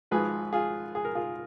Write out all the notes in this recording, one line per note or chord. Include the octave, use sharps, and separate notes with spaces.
G#1 G#2 F3 G#4 B4
F4 G#4
G#4
A#4
F4 G#4